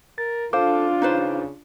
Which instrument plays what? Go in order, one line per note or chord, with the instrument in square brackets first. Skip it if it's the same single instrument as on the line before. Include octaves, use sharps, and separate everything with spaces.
[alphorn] A#4 [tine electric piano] A6
[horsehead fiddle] D4 F4 [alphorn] A4 [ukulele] C5 [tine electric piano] F5 D6
[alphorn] C#3 [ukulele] D#4 B4 C5